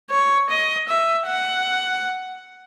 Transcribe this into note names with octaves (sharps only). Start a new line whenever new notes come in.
C#5
D#5
E5
F#5